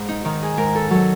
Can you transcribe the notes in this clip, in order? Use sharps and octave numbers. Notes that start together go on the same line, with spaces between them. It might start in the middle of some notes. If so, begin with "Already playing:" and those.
Already playing: G#2
D#4
D#3 D#4
G#4
G#2 A#4
A4
F#3 A4